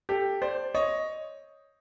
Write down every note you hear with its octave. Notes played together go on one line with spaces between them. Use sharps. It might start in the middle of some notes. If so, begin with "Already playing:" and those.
G4 A4
C5 D5
C#5 D#5